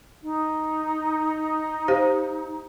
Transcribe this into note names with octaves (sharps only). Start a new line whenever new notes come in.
D#4
G4 C5 F5